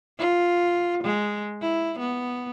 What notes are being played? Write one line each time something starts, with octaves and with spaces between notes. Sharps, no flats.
F4
G#3
E4
B3